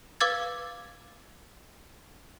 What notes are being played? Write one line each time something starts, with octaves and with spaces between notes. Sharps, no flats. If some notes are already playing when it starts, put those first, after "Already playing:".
B4 F5 D6 E6 G#6 A6